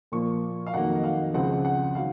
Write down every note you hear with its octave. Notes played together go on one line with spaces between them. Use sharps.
A#2 F3 A#3 C#6
F5
F2 D#3 F#3 A#3 F#5
D#5
F5
C#2 C#3 F3 C4 F#5
F#5
D#3 F#3 F5